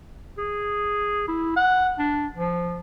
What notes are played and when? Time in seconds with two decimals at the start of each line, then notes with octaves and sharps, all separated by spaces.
0.38 G#4
1.28 E4
1.56 F#5
1.99 D4
2.37 F3